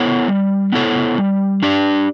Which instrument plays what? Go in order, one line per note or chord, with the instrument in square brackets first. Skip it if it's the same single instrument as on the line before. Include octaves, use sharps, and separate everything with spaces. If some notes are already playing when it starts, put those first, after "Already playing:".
Already playing: [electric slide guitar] B3 E4 A4 C#5
G3
B3 E4 A4 C#5
G3
D4 G4 D5